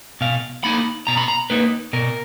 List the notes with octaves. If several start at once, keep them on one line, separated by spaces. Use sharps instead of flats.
B2 F5
A#3 D#4 B5
B2 A#5
B5
A#5
A#3 D#4 B4
B2 A#4